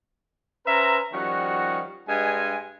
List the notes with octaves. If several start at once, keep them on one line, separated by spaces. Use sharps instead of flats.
C#4 B4 C5 E5 A#5
D#3 F3 G3 C#4 F#4
G2 G#3 G#5